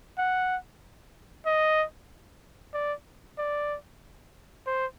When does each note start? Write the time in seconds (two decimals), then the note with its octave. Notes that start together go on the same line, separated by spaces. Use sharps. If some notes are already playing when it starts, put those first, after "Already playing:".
0.18 F#5
1.46 D#5
2.74 D5
3.38 D5
4.67 C5